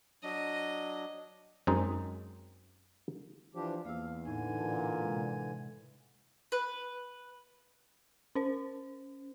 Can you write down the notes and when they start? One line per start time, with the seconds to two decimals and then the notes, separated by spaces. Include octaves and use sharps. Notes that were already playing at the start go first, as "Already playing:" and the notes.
0.24 F#3 D4 D#5
1.67 F#2 G#3 C4 D#4
3.55 E3 F3 D4 G4
3.85 E2 A#3 F5 E6
4.25 A2 D3 E3 D#4 G#5
4.59 A#2 A5
5.01 C3 G#3
6.52 B4
8.35 C#4 C5